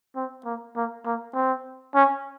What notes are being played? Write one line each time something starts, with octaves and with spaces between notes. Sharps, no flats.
C4
A#3
A#3
A#3
C4
C#4